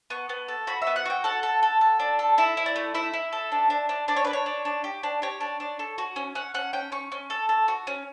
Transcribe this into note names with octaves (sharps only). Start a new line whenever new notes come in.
B3 C#6
B3
A4
F#4 B5
E5
B3
F#5
F#4 G5
A4 F#5
A4
A4
A4
D4
A4
E4 E5
E4
D5
A3
E4 E5
E4
A4
D4
D4
D4
D4 D5
C#5
D4 B4
C#5
D4
D4
G4
D4
G4 C#5
D4
D4
A4
F#4
C#4
C#4 F#5
C#4 F#5
C#4 G5
C#4 C#6
C#4
A4
A4
F#4
C#4